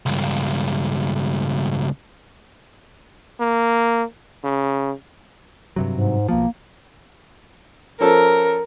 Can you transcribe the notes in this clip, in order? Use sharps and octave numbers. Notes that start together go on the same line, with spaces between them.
C#2 G2
A#3
C#3
G2 C3 F#3
G#2
B1 F3 A#3
F3 C#4 A4 A#4